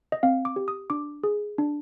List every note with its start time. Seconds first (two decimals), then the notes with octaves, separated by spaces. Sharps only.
0.12 D#5
0.23 C4 F5
0.45 D6
0.56 G4
0.68 D#6
0.90 D4 D6
1.24 G#4
1.58 D4